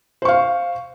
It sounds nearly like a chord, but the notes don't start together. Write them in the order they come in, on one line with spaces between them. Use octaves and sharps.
C5 C#6 F5